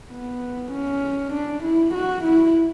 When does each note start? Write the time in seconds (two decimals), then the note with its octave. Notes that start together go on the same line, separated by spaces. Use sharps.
0.11 B3
0.72 C#4
1.33 D4
1.64 E4
1.94 F#4
2.24 E4